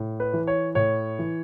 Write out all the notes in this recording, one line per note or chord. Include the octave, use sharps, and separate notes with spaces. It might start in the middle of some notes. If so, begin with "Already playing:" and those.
Already playing: A2
B4
E3
C#5
A2 C#5
E3